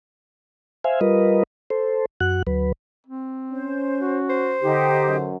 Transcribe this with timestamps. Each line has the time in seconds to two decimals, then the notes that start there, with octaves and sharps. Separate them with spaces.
0.84 C5 E5 F5 G#5
1.01 G3 F4 A#4 B4 D#5
1.70 A4 C5
2.21 F#2 F#4 F#5 F#6
2.47 D2 F#3 B4
3.07 C4
3.52 C#4 C5
3.99 F#4
4.30 C5
4.62 D3 D#4 G4
5.07 F#2